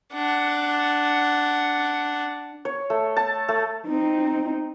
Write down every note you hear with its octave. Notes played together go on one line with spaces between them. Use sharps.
D4 F#5
C#5
A3
A5
A3
C4 D#4